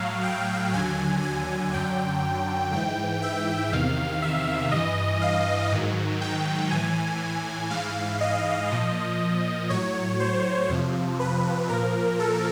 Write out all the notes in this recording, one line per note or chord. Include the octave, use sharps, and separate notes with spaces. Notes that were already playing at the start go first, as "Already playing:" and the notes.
Already playing: A2 F#3 F5
G5
D#2 D3 F#3 G#5
G#5
F#2 D3 F#3 G5
G#2 E3 G5
E5
E2 C3 D#3 F5
E5
G2 E3 D#5
F5
G#2 D#3 F#3
G5
A2 E3 G#5
G#2 E3 F5
D#5
A#2 F3 D#5
A2 F#3 C#5
C5
F2 C3 F3
B4
A#2 F3 A#4
A4